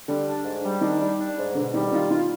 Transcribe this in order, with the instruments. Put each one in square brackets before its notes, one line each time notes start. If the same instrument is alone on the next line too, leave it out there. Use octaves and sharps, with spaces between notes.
[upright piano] D3 [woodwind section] G3
[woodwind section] D4
G#2
G3
[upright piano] D#3 [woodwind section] D4
[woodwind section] G3
D4
G#2
[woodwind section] B2 [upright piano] D3
[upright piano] D#3 [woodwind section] G3
[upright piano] D#3 [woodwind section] F4
[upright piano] D#3 [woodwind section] F4